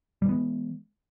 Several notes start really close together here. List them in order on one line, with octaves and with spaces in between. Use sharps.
G3 E3 B3 G#3